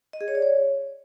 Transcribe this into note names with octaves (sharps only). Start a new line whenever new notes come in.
D#5
G#4
C#5
D5
C#5